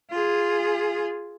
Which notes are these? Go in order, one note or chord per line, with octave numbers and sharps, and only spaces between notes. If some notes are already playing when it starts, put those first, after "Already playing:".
F4 G#4